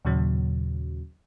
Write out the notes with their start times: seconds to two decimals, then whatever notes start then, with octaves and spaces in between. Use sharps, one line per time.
0.05 D#2 A#2 C#3 F#3